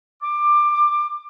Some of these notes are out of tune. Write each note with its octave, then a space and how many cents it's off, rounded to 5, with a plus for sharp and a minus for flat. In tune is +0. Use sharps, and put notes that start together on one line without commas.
D6 +20